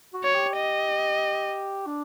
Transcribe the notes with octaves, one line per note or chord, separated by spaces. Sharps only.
F#4
C#5
G4
D#5
D4